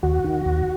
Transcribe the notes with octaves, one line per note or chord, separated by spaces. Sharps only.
D#2 F#4
D#3
D#2